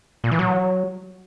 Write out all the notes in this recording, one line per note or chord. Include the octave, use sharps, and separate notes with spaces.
A#2
E3
F#3